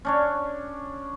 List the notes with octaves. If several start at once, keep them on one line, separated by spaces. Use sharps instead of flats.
C#4 D4 C#5